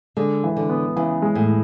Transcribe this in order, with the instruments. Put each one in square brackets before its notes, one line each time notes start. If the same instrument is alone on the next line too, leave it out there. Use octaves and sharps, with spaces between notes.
[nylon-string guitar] D3 [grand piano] G#3
[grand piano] E3
[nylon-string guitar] D3
[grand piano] B3
[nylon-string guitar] C#3 [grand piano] E3
[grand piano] G#3
[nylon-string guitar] A2